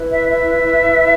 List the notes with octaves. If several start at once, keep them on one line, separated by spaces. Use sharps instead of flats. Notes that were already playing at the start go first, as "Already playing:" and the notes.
Already playing: E4 B4
E5
E5